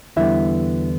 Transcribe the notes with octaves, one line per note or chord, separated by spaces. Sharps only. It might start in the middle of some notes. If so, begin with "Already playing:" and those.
E2 D3 G3 B3 E4 E5